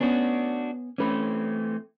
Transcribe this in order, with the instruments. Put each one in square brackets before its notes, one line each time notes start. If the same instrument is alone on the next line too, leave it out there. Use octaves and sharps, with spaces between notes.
[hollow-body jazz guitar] B3 C#4 [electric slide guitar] D4 F#4
[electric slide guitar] E3 A3 C4 [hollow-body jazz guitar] C#4 B4